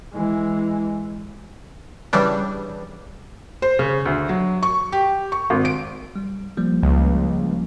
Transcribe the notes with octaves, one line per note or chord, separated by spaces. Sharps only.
E3 G#3
C#3 E3 G3 D4
C5
C#3
D2
F#3
C#6
G4
C#6
G#1
D7
G3
F3 G3 A#3
C#2